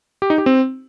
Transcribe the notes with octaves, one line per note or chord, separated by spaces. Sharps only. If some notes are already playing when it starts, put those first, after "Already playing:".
G4
D#4
G4
C4